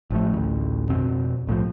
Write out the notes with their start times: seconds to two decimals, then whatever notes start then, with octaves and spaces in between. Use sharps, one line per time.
0.10 A1 F3 A3
0.33 A1 D2
0.89 F2 B2 C4
1.47 B1 A2 E3 F3